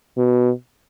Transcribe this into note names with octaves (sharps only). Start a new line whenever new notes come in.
B2